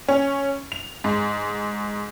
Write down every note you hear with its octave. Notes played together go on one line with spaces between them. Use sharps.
C#4
F7
G#2